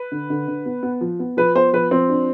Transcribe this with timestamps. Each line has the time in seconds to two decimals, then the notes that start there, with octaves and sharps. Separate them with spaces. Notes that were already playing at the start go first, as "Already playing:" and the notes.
Already playing: B4
0.12 D3
0.30 D3
0.48 D3
0.66 B3
0.83 B3
1.01 F3
1.19 B3
1.37 F3 B4
1.55 B3 C5
1.73 F3 B4
1.91 F3 C4
2.10 D4